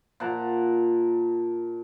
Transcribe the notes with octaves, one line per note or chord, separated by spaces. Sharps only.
A#2 F#5 A5 A#5